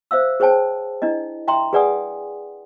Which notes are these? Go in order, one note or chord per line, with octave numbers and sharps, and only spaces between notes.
C5 E5 F5 E6
G#4 C5 C#5 G5 A5
D4 E4 D#5
E5 G5 A#5 C6
G#4 B4 D5 F#5 G#5 D#6